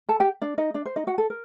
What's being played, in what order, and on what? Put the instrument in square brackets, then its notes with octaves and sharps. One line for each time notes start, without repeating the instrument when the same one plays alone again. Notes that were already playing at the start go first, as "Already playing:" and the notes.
[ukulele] A4 A5
G4 G5
D4 D5
D#4 D#5
D4 D5
C5
D#4 D#5
F#4 F#5
A4
A#4